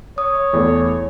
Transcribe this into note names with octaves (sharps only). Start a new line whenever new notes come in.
C#5 D#6
E2 A3